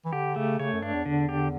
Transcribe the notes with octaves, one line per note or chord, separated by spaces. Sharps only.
E3
D3 G4
C#3 A3
C#3 C#5
F#2
G2 D4
E2
E2 D3
G4